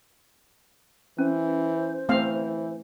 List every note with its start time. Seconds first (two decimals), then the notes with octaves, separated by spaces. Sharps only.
1.18 E3 C#4 C5
2.09 E3 A3 C4 F5